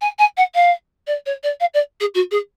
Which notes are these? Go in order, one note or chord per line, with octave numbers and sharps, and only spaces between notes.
G#5
G#5
F#5
F5
D5
C#5
D5
F5
D5
G#4
F#4
G#4